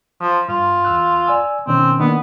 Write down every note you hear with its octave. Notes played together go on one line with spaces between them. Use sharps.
F3
G2 F4
E2 E6 F#6
D5 G#5 E6
B2 D#3 C4 C#4
D#3 A#3 B3 D4